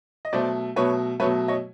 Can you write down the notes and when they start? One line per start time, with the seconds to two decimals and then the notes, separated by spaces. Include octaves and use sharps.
0.25 D#5
0.33 B2 F#3 A3 C5 D5
0.76 B2 F#3 A3 B4 C#5
1.20 B2 F#3 A3 B4 C#5
1.48 C#5 D#5